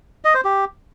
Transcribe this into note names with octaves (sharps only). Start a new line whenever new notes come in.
D#5
C5
G4